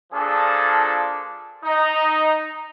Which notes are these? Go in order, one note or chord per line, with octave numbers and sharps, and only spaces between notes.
A#2 F3 D4 G#4 A4
D#4